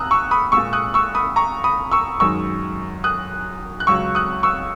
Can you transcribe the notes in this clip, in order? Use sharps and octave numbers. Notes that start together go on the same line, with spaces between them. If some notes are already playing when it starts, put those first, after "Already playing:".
Already playing: D#2 A#5 D#6 E6 F#6
C#6 E6
B5 D#6
A#2 G#3 C#6 E6
D#6 F#6
C#6 E6
B5 D#6
A#5 C#6
B5 D#6
C#6 E6
F#2 D#3 G#3 C#6 E6
D#6 F#6
F#6
C#2 C#3 F#3 C#6 E6
D#6 F#6
C#6 E6